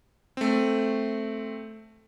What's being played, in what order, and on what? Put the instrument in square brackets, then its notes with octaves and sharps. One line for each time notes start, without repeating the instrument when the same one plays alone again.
[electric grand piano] A3 C4